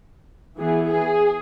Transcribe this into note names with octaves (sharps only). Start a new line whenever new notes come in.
E3 B3 E4 G#4
G#4